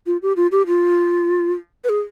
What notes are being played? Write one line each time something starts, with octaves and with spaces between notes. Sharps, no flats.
F4
G4
F4
G4
F4
B4
G#4